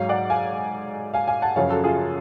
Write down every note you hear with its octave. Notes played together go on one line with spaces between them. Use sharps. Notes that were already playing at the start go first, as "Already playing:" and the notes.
Already playing: G#2 F#3 C#5 F5
D5 F#5
F5 G#5
F5 G#5
F5 G#5
F#5 A5
F#2 C#3 F3 C#5 F5
F#4 A4
F4 G#4